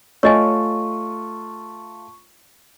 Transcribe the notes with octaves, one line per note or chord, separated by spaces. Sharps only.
A3 F4 C#5 D#5 G#5 C#6